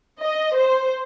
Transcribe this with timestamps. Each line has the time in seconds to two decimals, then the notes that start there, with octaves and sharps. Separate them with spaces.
0.21 D#5
0.56 C5